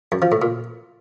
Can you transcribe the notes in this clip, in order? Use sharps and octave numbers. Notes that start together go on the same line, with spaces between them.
F#2
F3
A2
A#2